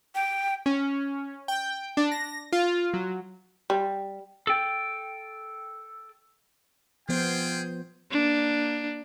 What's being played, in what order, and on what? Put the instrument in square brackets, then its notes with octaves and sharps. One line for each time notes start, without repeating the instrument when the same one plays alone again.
[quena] G5
[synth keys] C#4
G5
D4
A#6
F4
F#3
[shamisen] G3
[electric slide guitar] A4 G5
[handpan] F3 B3 C5 [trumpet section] F4 G#4 G5
[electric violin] A#3 D4